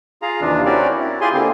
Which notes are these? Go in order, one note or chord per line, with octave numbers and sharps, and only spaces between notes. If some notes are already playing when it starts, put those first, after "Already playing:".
F4 G#4 F5 A#5
D#2 C3 E3 D4 F4
C4 C#4 E4 F#4 A#4 D5
E4
F4 G4 G#4 G#5 C6
D3 A#3 C4 E4